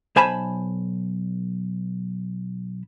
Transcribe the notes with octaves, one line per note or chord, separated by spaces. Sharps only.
B1 C5 G#5 A5 B5